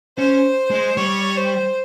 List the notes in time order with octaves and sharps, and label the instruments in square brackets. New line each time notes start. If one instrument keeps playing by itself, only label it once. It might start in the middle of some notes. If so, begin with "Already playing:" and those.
[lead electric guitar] C#4 [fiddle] C5
[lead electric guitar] G#3
[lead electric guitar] G3 [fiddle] C#5
[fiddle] C5